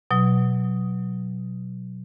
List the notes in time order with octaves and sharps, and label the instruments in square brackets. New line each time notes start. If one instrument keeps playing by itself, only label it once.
[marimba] B2 F#3